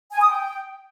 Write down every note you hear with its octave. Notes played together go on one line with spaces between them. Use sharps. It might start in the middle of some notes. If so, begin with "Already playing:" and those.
G#5
D#6
G5